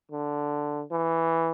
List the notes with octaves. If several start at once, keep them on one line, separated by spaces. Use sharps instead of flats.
D3
E3